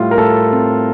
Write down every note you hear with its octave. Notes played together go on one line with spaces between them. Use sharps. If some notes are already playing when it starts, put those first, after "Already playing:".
Already playing: A2 G3 F4
A#4
A2 A4
C4